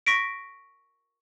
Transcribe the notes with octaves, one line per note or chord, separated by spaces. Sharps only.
C#6 A#6 B6 D7